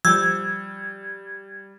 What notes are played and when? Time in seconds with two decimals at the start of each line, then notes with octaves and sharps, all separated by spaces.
0.05 F3 G3 E6 G6 G#6